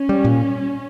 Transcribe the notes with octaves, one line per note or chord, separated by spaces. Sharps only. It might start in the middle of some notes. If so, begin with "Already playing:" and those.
Already playing: C#4
G3
A#2